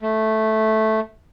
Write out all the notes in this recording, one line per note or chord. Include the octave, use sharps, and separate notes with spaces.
A3